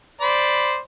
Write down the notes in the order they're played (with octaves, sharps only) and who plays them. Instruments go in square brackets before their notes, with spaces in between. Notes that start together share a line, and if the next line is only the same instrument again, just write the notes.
[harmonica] C5 D5 B5